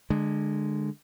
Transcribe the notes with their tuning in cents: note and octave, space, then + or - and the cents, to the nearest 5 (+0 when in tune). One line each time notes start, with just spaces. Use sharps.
D3 +20 G#3 +0